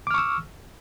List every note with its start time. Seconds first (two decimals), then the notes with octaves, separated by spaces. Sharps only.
0.07 D6
0.11 F6
0.14 C#6
0.18 E6